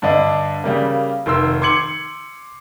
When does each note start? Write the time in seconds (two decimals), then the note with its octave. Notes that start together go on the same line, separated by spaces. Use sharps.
0.02 G2 D3 D4 D#5
0.64 C#3 G3 A#3
1.26 F1 D#3 C6 E6
1.62 C6 D6 G#6 C#7 F#7